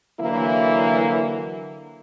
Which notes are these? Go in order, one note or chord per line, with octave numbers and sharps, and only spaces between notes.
D3 E3 F#3 A#3 E4